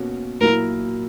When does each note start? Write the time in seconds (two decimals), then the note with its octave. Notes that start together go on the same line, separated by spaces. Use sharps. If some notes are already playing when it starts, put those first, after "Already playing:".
Already playing: B2 A#3 C#4 F#4
0.40 A#2 F#3 A#3 E4 A#4